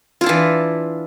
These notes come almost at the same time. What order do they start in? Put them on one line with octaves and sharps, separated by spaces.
F4 E4 D4 E3